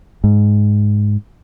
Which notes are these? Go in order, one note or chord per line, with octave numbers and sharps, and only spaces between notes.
G#2